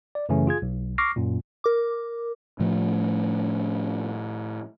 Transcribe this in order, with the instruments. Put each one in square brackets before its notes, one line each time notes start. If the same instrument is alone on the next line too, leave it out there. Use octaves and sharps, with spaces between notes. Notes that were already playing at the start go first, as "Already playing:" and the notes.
[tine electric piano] D5
F#2 C#3 E3 A3 C#4
F4 G#4 G#6
B1
C#6 D6 F6 A#6 C7
F#2 A#2
[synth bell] A#4 D6
[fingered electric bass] A2 F3 A3